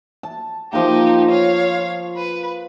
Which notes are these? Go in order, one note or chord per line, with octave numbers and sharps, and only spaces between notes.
A5
F3 A#3 D#4 G4
C#5 F5
B4